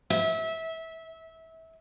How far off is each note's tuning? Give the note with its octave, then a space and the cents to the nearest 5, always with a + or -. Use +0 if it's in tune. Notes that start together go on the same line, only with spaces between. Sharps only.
E5 -25